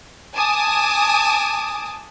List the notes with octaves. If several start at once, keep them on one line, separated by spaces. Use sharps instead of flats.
G#5 A5 D6 D#6